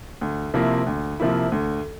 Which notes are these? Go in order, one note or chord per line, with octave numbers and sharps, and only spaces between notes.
D2
C3 F3 A#3 E4
D2
C3 F3 A#3 E4
D2